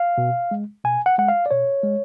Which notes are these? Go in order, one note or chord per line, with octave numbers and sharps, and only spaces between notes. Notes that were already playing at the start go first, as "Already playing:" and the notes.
Already playing: F5
B2
G#3
B2 G#5
F#5
G#3 F#5
F5
D5
B2 C#5
G#3